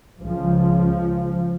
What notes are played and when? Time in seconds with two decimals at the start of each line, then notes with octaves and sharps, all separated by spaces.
0.21 C#2 C#3 F3